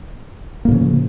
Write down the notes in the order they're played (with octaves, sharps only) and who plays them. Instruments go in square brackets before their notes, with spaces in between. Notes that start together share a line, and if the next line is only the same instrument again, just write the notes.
[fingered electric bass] A#3
A2
C#3
F3